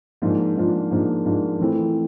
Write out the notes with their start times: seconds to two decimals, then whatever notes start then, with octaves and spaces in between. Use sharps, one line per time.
0.22 G#2 F3 A#3 D4 F4
0.56 G#2 F3 A#3 D4 F4
0.91 G#2 F3 A#3 D4 F4
1.25 G#2 F3 A#3 D4 F4
1.59 E3 A3 C4 E4